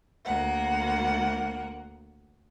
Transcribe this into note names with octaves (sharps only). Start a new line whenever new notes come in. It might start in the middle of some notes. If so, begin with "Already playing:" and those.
D2 A#3 F#5